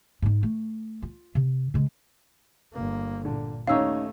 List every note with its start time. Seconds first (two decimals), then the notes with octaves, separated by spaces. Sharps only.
0.22 G#2 D#4
0.43 A3
1.02 F4
1.35 C3
1.74 C#3 G#3
2.73 G1 A#3
3.25 A#2 D3
3.67 D#2 A3 C#4 D#4 C#5 F5 E6